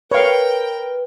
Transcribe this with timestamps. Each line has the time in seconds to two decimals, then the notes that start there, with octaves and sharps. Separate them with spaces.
0.11 A#4 B4 C#5 F5 G5